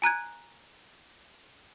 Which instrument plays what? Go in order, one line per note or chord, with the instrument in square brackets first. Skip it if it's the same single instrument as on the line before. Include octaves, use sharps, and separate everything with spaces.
[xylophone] G#5 A#5 F#6 G#6